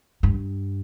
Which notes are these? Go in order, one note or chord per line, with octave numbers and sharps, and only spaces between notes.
G2